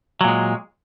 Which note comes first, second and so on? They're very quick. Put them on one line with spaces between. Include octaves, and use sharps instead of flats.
F#3 A#2 G#3